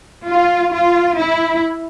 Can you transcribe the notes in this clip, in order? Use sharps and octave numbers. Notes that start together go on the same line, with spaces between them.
F4
F4
E4